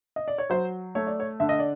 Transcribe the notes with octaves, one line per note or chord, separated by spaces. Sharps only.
D#5
D5
C#5
F#3 C5
A3 C#5
D5
C#5
D3 E5
D#5
D5